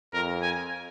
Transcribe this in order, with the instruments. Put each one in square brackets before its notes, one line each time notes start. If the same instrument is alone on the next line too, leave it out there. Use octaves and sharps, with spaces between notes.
[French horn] F2 [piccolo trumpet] A#4
[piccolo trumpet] G#5